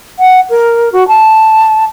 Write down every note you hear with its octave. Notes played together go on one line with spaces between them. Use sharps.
F#5
A#4
F#4
A5